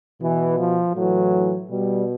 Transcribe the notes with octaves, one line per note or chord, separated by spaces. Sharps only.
B2 E3
F3
A2 E3 F#3
B2 G3